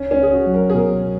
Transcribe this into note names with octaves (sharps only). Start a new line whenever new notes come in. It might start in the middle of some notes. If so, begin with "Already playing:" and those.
Already playing: C#2 C#4
C#4
C#2 G#4
F#4
F#3
A#4
G#4
B2 A#4